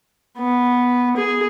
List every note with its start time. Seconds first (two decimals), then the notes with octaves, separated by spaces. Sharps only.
0.38 B3
1.17 G#4